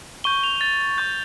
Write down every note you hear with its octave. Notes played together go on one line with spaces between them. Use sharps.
C#6 G6 G7
F7
A6
C#6 G6